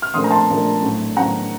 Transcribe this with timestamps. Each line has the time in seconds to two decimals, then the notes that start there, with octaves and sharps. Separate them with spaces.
0.02 F6
0.14 A#1 A#2 A3 C4 C6 D#6
0.24 A#5
0.31 A5 C6
0.48 A#1 A#2 A3 C4
0.82 A2 F#3 C4
1.16 A2 F#3 C4 F#5 A#5